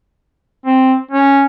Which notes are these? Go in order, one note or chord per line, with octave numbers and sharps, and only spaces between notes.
C4
C#4